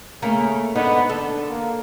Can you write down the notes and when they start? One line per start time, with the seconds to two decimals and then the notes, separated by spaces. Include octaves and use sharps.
0.22 C#3 A3 A#3 A#4
0.75 G#2 D3 B3 D#4
1.09 D3 A4
1.48 A#3